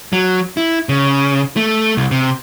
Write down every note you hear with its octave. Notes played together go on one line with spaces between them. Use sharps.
F#3
E4
C#3
A3
C2
C3